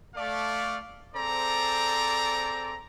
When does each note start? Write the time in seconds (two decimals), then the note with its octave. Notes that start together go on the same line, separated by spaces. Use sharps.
0.15 A3 D5 F5
1.14 C4 G#4 A4 C5 D5 A#5